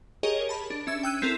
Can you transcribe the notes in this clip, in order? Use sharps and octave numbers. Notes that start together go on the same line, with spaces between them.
G4 G#4 A#4 C#5 D#5
A5 B5
D4
C#4 E5 E6 G#6
G5 E6 F#6 D#7
C4 E4 A4 A#4